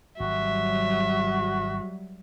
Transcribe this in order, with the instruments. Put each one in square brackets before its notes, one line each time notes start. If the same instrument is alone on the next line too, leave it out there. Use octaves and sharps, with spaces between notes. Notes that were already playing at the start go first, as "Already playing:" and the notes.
[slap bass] G#1 [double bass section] F#3 G3 [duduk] F#4 [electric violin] E5